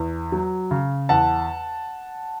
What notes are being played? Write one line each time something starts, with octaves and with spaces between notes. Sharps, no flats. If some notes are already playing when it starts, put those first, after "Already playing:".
Already playing: E2
F#3
C#3
E2 F#5 A5